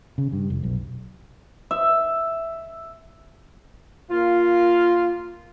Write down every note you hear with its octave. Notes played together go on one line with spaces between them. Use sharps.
C#3
G2
F1
B1
E5
A#3 F4